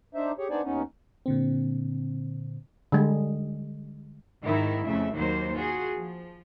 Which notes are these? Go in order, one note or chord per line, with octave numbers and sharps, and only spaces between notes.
D4 D#4 C5 E5
G4 G#4 C#5
B3 D4 D#4 C5 D5 G#5
D#2 B3 C#4 D#4
A#2 D3 C4
D3 G3 G#3
G#2 D#3 D#4 E4 E5
F2 C#3 A3 E5
D#2 D#3 F#3 A#3 C5
F4 F#4 G#4
F3